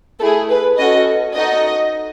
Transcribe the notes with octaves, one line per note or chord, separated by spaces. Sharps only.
A3 E4 G#4 A4
B4
C#4 F#4 A4 D#5
D#4 F#4 A4 D#5